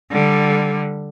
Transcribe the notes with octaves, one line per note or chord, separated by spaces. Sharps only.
D3 G3